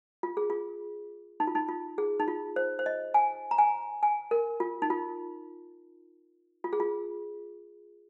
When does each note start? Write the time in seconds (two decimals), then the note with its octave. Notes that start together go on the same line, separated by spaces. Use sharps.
0.23 F4
0.37 G#4
0.50 F4
1.40 D#4
1.47 F4
1.55 D#4
1.68 F4
1.98 G#4
2.20 D#4
2.28 F4
2.56 C5
2.79 C5
2.86 D#5
3.14 G#5
3.51 A#5
3.58 G#5
4.03 G#5
4.31 A#4
4.60 F4
4.82 D#4
4.90 F4
6.64 F4
6.73 G#4
6.80 F4